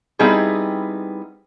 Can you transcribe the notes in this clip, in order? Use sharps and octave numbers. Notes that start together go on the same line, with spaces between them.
G3 B3 C4 D#4 E4 G#4